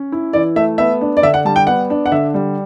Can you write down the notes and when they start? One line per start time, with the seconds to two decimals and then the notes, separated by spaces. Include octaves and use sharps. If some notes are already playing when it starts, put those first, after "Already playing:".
Already playing: C#4
0.12 E4
0.33 E3 D5
0.56 A3 E5
0.78 B3 E5
1.01 D4
1.17 D5
1.23 D3 E5
1.34 F#5
1.45 G3 A5
1.56 G5
1.67 B3 F#5
1.90 D4
2.06 F#5
2.12 D3 E5
2.34 G3